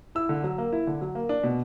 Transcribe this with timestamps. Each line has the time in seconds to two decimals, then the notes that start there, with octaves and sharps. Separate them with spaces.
0.15 E4 E6
0.29 D3
0.44 F#3
0.58 A#3
0.73 E4
0.87 D3
1.01 F#3
1.15 A#3
1.29 D4
1.43 B2